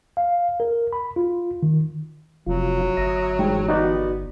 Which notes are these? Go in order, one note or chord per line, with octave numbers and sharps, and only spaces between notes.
F5
A#4
B5
F4
D#3
F1 C3 F3 F#3 F4
G1 E5 A#5 D#6
G#2 E3 G3 G4
B3 D#4 F#4 D5